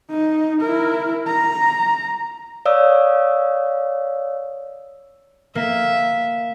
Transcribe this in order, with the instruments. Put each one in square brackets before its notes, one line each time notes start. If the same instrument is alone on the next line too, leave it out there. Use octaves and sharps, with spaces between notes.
[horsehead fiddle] D#4
E4 A#4
A#5
[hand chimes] C#5 D5 F5 D#6 E6
[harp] A#3 [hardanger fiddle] E5